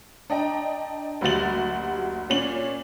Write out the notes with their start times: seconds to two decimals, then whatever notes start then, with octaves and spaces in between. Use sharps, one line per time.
0.30 D4 D#5 G5 A#5
1.21 F#1 D2 G3 F#4 A6 F#7
2.30 A#2 C#4 C#5 F#7